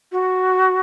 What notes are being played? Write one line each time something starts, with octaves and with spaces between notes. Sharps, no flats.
F#4